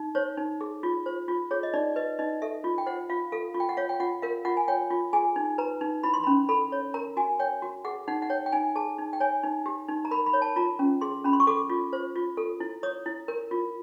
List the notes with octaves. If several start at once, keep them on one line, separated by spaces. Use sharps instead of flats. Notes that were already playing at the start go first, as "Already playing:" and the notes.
Already playing: D#4
C5 C#5
D#4
G#4
F4
C5
F4
G#4 C#5
D#5
D#4 D5
B4 D#5
D#4 D#5
A4 E5
F4
G5
C5 F#5
F4 F5
A4 F5
F4
G5
F#5
C#5 F5
G5
F4 F#5
A#4 F5
F4 F#5
G#5
C#5 G5
F4
G#4 G#5
D#4
B4 A#5
D#4
E4 B5
C6
B5
C#4
A4 B5
C#5
A#4 A#5
F#4 G#5
C#5 G5
F#4
G#4 F#5
D#4 F#5
F#5
C#5 G5
G5
D#4 G#5
G#4 A5
D#4
G5
C#5 G#5
D#4
G4
D#4
A#5
A#4 B5
B5
C#5
A5
F4 A#5
C#4
G#4 C6
C#4 B5
C6
C#6
A4 D6
F4
C5
F4
A4
E4
C#5 D#6
E4
A#4
F4